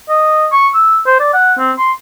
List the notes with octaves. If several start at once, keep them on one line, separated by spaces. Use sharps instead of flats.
D#5
C#6
E6
C5
D5
F#5
C4
C6